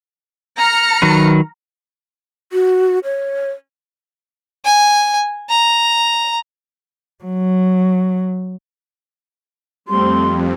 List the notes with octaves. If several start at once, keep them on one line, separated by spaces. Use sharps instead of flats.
A#5 F6 C#7
D#3 F#3 B4
F#4
C#5
G#5
A#5
F#3
F2 G3 A3 C4 C6